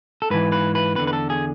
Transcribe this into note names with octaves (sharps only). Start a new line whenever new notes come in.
A4
G#2 E3 B4
B4
B4
E2 D3 B4
B4
A4
G#4